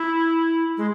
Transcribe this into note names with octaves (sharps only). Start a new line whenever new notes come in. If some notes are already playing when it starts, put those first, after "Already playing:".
Already playing: E4
G#3